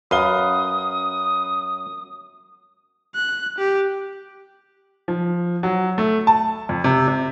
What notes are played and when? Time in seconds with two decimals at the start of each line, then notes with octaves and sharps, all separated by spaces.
0.11 F#2 B4 F5 D#6 G7
3.15 F#6
3.58 G4
5.08 F3
5.63 F#3
5.98 A3
6.27 A5
6.69 F2
6.84 C3
7.08 C3